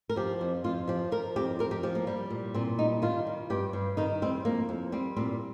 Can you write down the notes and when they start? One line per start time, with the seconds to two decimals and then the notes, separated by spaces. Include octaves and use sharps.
0.10 A#4
0.16 F3 G4
0.41 F2
0.64 F2 F4
0.88 F3 G4
1.12 F3 A#4
1.36 F2 G4
1.59 F2 A#4
1.71 G4
1.83 F3 G4
1.95 A#3
2.07 G3
2.30 A#2
2.54 A#2 C4
2.79 G3 D#4
3.02 D#3 F4
3.27 G3
3.50 G2 G4
3.73 G2
3.97 D#3 D#4
4.22 G3 C4
4.45 F2 A#3
4.69 F2
4.92 G3 C4
5.17 A#2 C4